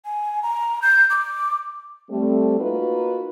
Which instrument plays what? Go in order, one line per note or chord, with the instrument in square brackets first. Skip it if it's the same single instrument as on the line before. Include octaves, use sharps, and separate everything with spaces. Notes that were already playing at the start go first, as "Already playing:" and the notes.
[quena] G#5
A#5
G6
D6
[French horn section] G3 A3 C4
A#3 D#4 F4 F#4 A#4 B4